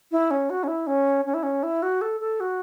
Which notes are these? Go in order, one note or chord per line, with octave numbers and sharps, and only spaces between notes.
E4
C#4
F#4
C#4
E4
C#4
C#4
E4
C#4
E4
F#4
A4
A4
F#4